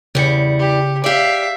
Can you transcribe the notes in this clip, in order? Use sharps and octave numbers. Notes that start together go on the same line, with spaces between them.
E2 C#3 G3 C#7
G4
G4 D5 E5 F5